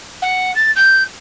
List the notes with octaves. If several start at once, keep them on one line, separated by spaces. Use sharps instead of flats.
F#5
A6
G6